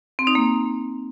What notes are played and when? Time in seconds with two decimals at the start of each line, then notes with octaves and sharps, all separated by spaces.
0.19 C4
0.27 D#4
0.35 A#3